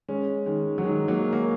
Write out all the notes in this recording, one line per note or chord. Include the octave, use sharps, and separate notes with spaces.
G#3 C#4
D#3 G#3
F#3
D#3 G#3
F#3 A#3
F#3 A#3